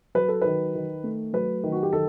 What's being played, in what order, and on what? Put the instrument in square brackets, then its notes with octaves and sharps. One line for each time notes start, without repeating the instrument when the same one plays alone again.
[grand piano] F#3 B4
A4
D#3 B4
D#3
A3
F#3 B4
D#3
F#4
G4
D#3 A4